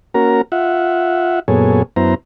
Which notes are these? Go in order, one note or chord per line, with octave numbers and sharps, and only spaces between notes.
A#3 C#4 F#4 A#4 A#5
F4 E5 F#5
F#2 A#2 B3 G#4 A4 C#5
F#2 B3 E4 C5 A#5